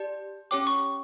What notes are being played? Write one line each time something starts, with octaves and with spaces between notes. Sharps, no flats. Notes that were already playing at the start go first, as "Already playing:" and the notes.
Already playing: G4 D5 A5
C#4 G4 C#5 G5 D6
C#6